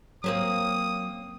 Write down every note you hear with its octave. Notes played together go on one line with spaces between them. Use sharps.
F#3 A#3 C4 C#4 D#6